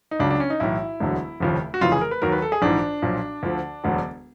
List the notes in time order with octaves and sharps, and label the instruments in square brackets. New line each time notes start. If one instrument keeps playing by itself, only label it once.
[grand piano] D#4
C#2 C#3 F#3 D4
D4
C#4
D#4
B1 A2 E3 E4
E1 D2 D3 F#3
F1 D#2 C#3 F3
F#4
F1 F2 C#3 E3 F4
G#4
A#4
B4
D#2 D#3 F#3 A#4
B4
A4
G#4
A#1 G#2 E3 D4
B1 A#2 F3
D2 D3 F3
E1 D2 D3 F#3